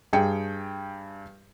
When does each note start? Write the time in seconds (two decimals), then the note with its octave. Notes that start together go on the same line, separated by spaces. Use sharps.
0.13 G2 G#4 G5 C#7